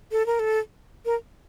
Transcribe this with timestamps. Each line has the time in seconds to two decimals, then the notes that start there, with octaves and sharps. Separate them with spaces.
0.12 A4
0.26 A#4
0.39 A4
1.06 A#4